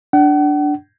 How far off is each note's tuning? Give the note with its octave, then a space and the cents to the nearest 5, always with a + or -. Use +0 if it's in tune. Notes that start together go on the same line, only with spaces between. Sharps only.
D4 +0 F#5 +40